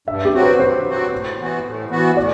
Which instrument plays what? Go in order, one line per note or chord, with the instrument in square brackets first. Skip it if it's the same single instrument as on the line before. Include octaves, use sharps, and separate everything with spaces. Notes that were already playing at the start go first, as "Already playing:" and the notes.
[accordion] G2 [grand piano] E5
[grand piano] G4
[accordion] F#3 C4 F#4
[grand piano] B4
[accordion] G2 [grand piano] C5
[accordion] F#3 C4 F#4
A2
E3 B3 F#4
A2
E3 B3 F#4
[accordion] A2 [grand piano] D5